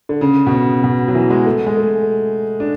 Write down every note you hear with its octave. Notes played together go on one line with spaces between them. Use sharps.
D3
C#3
B2
C#3
B2
F#3
E3
G#3
A3
G#3
A3
D4